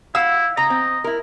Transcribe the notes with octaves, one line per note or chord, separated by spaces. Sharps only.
E4 F5 F#5 E6
C#3 D#5 A#5
C4
E4 A#4